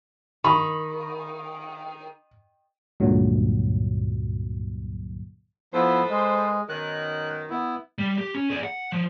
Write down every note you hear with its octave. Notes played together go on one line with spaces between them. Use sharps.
D#3 B5 C#6
C#2 G2 A#2 D3 F#3
F3 B3 E4 A4 B4 C5
G#3
F#2 B2 D#3 F#6
B3 E4
G3
G4
C#4
G#4 D5
F#5
F3